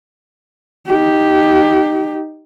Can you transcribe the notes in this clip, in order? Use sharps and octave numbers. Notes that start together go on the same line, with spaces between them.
D#4 G4